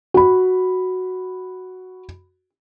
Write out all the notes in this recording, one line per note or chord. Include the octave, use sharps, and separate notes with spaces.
F#4 B5